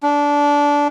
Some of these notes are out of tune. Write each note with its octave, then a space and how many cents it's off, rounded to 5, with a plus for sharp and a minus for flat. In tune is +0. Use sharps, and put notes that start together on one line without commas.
D4 -20